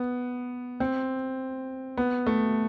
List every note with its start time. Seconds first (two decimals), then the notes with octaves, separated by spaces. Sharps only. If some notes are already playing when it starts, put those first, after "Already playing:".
Already playing: B3
0.80 C4
1.97 B3
2.27 A3